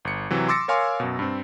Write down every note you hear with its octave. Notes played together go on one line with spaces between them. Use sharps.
G1 C#7
C3 E3 F#3
C6 D6 E6 A6 A#6 C#7
A#4 C#5 F5 G#5 C6 D6
F#2 B2
G2 C4